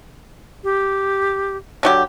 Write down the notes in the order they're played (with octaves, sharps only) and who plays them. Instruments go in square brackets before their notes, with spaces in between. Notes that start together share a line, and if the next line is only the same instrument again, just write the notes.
[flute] G4
[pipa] D3 F#3 G4